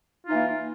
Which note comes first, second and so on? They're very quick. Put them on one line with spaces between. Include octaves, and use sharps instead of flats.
F4 D#4 E3 A#3